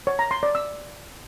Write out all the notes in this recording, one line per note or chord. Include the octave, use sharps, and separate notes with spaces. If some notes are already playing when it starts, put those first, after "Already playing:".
C#5
A#5
C6
D5
E6